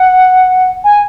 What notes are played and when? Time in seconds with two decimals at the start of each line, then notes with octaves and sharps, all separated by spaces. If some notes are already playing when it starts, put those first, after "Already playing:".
Already playing: F#5
0.84 G#5